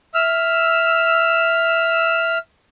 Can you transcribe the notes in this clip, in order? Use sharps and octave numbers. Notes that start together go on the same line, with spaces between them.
E5 E6 F6